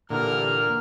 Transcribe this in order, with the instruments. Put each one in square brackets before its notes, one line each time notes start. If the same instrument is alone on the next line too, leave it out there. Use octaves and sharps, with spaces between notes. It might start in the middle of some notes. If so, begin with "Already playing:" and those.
[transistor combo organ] A#2 [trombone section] D3 E3 G4 [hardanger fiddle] A#4 [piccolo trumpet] F6